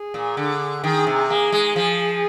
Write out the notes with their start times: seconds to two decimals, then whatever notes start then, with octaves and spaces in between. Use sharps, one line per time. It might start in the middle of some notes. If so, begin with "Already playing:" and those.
Already playing: G#4
0.14 A#2
0.37 D3
0.84 D#3 G#4
1.07 C3
1.29 A#3 G#4
1.52 G#3
1.75 F3 G#4